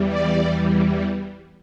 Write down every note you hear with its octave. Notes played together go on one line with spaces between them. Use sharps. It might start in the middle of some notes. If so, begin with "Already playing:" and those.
Already playing: E2 E3 G3
D5